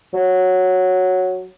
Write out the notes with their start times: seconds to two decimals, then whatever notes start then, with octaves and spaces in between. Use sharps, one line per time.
0.14 F#3